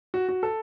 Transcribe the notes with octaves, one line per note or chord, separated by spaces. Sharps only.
F#4
F#4
A4